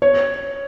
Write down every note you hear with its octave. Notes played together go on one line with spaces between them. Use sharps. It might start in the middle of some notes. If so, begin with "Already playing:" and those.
C#5